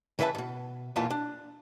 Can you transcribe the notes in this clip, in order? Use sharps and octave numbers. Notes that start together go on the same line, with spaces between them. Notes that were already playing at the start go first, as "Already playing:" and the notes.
C#3 E3 B4 E5 A5
G2 B2
B1 E2 A#2 E3 F4 A5
D4